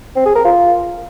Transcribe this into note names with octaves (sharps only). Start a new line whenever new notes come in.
C4
G#4
A#4
F4